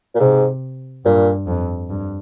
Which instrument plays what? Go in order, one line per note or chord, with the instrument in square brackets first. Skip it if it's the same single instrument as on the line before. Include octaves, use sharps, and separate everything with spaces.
[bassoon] A#2
[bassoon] G#2 [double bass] C3
[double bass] G2 [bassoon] A#2
[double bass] F2
G2